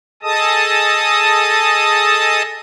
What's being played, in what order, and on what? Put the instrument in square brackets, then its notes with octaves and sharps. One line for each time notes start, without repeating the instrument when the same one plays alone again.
[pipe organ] G#4 A4 D#5 A5 D#6